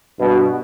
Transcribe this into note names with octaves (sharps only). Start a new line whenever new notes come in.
G2 B2